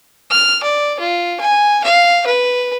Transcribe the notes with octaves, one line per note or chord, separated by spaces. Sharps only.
F6
D5
F4
G#5
F5
B4